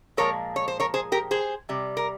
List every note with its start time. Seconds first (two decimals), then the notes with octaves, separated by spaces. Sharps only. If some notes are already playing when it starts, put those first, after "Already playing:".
0.17 A#2 F3 G#3 A#4 C#5
0.56 C#5
0.68 C5
0.80 A#4 C#5
0.94 G#4 C5
1.12 G4 A#4
1.31 G#4 C5
1.69 C3 G3
1.97 A#4